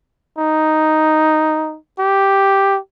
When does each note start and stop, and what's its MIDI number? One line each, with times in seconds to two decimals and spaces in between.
0.38 1.77 63
1.99 2.79 67